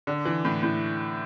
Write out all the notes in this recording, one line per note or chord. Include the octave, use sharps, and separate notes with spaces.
D3
E3
A2
A2